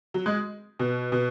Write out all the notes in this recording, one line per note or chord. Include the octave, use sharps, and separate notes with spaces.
F#3
G#3
B2
B2